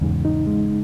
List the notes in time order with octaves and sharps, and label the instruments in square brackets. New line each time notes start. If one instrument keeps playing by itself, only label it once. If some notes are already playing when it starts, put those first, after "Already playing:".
[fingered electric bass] E2 G#2 [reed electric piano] C#3
[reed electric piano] D#4
G#3